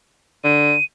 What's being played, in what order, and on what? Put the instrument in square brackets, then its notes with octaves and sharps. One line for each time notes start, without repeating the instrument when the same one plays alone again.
[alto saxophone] D3 [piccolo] D#7